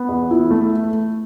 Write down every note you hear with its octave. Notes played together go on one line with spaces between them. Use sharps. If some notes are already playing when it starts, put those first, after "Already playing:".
Already playing: B3
E2
E4
A3